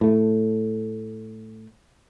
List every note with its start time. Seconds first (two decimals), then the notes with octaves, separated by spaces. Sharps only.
0.01 A2 A3